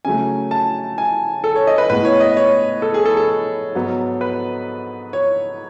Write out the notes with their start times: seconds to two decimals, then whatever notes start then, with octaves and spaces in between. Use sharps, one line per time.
0.05 C#3 F#3 A3 G#5
0.51 A5
0.98 G#5
1.44 A4
1.56 C#5
1.67 D#5
1.78 B4
1.90 A2 G#3 B3 B4
2.05 C#5
2.20 D#5
2.37 C#5
2.82 A4
2.94 G#4
3.06 A4
3.17 A4
3.75 G#2 F#3 B3
4.21 B4
5.13 C#5